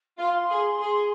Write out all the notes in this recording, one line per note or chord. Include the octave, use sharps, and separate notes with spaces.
F4 C6
G#4
G#4